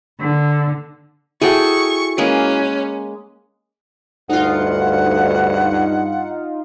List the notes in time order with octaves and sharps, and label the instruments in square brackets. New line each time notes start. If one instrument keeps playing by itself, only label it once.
[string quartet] D3
[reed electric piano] E4 F#4 [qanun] G#4 A4 G5 [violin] C#6
[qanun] G#3 A#3 B4 [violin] C#4
[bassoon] D2 [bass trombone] G2 [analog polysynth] D#4 F4 [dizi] F#5